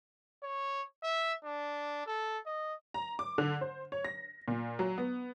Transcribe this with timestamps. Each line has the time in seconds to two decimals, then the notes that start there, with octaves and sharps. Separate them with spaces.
0.43 C#5
1.03 E5
1.45 D4
2.06 A4
2.46 D#5
2.94 A#5
3.19 D6
3.38 D3
3.61 C5
3.92 C#5
4.05 A#6
4.48 A#2
4.79 F#3
4.98 B3